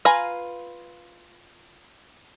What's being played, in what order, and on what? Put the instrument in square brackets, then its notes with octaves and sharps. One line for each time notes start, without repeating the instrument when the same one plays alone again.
[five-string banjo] F4 B4 F5 G#5 A#5